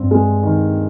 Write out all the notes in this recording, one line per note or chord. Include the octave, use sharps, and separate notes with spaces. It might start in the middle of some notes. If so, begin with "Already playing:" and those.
Already playing: G2 C4
G#3
D#3